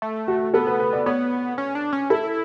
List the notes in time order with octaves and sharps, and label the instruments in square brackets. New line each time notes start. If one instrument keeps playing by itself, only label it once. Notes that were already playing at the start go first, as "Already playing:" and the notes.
[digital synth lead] A3
[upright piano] F#4
[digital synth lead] B3 [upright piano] A4
[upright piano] B4
B4
D5
[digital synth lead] B3 [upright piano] C#5
[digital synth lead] C#4
D4
C#4
[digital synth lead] E4 [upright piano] A4